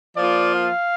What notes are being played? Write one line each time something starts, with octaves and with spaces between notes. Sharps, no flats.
F3 A#3 F4 D5
F5